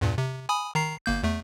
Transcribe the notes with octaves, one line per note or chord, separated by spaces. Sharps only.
E2 G2 A#2
C3
G#5 B5 D#6
D#3 A#5 C7
G1 A#3 G6
E2 A3